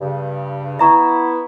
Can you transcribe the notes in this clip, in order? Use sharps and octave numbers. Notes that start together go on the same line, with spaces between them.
G2 C#3
B3 E4 E5 A#5 C#6